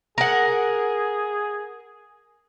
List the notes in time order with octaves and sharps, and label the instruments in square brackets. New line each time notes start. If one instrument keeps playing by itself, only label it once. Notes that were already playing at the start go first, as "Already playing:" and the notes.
[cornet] G#4 [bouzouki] A#4 F#5